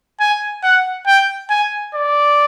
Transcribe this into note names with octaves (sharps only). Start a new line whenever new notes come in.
G#5
F#5
G5
G#5
D5